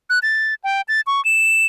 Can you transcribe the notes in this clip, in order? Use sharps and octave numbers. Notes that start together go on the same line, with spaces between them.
F#6
A6
G5
A6
C#6
E7